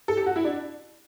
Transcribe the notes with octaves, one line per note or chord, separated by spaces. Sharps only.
A4
G4
F#4
E4
D4